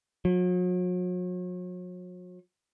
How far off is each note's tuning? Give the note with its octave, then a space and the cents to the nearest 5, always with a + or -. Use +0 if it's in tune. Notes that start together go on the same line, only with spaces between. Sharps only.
F#3 -40